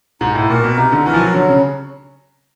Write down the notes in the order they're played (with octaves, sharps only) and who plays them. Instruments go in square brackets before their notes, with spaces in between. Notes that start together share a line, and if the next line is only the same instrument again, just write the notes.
[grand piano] G#2 [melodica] D#4
[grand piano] A2
[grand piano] A#2 [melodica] F#4 A#4
[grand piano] B2
[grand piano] C3 [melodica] D#4
[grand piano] D3
[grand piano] E3 [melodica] F#4 A#4
[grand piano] F3
F#3
[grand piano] D3 [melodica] F#3
[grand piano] C#3